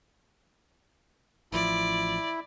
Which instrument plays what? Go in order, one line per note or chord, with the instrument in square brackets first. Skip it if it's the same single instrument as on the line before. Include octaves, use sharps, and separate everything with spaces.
[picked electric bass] A1 F3 [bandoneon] E4 [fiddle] D5